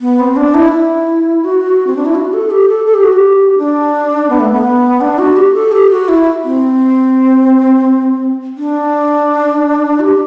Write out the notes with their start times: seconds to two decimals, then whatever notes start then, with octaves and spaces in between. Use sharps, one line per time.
0.01 B3
0.19 C4
0.36 D4
0.54 E4
0.72 E4
1.44 F#4
1.87 C4
1.96 D4
2.05 E4
2.15 F#4
2.34 A4
2.51 G4
2.69 A4
2.86 A4
2.94 G4
3.04 F#4
3.13 G4
3.58 D4
4.30 B3
4.40 A3
4.52 B3
5.01 D4
5.19 F#4
5.37 G4
5.54 A4
5.72 G4
5.90 F#4
6.08 E4
6.44 C4
8.57 D4
10.00 G4